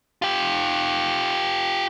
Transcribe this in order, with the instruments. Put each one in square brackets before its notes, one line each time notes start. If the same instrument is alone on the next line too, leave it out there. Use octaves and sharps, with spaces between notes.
[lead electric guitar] F4 G4